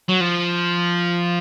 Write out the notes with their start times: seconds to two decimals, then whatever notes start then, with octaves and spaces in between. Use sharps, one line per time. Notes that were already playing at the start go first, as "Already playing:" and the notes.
0.09 F#3
0.20 F3